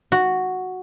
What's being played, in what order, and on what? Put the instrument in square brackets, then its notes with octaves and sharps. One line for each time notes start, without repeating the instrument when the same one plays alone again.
[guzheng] F#4